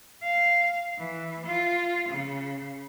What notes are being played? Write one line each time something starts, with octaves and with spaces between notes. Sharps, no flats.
F5
E3
F4
C#3